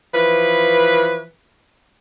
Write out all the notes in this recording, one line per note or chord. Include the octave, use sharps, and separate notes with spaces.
E3 F3 B4